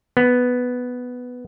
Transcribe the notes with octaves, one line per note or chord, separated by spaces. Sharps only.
B3